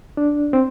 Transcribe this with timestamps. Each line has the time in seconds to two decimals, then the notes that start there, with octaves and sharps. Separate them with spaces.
0.17 D4
0.53 C4